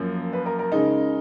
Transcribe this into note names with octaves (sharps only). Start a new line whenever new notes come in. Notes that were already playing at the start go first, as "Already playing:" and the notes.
Already playing: F#2 F3 A#3 C#4
B4
A#4
A#4
C#3 G#3 D#4